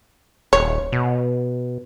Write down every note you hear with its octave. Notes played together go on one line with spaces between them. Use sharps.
D#1 C#5
B2